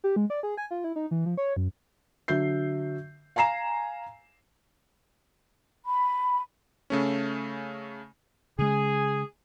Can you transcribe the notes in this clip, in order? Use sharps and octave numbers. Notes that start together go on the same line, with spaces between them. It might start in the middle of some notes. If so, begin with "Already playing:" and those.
G4
G#3
D5
G#4
G#5
F4
E4
D#4
E3
F3
C#5
F#2
D3 F#3 E5 G6 C7
F5 G#5 A#5 C7 E7
B5
C#3 A3 C#4
C#3 G#3 G#4